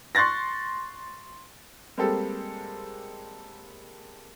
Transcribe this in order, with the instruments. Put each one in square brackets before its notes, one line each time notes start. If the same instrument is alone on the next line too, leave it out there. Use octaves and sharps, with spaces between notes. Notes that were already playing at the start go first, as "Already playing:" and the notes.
[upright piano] C6 C#6 F#6 A6 A#6
G3 G#3 A#3 C4 G4 A4